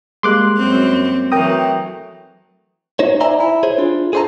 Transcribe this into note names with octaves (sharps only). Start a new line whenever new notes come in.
G3 G#3 A#3 C6 D6 F#6
F#2 C4
E3 F#3 A3 A#4 G5 A#5 D#6
D#4 C5 C#5
C5 D5 E5 G#5 A#5
E4
G#4 C5 C#5
D4 F4
G#4 A4 C5 D5 A5 A#5